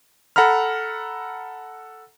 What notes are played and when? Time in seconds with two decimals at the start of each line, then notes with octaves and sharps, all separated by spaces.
0.36 A4 F#5 A#5 B5 F6